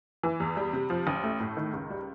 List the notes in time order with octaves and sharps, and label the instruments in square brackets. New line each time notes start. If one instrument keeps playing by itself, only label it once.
[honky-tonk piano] E3
E2
G3
C3
F3
A1
A3
A2
D#3
C#2
G3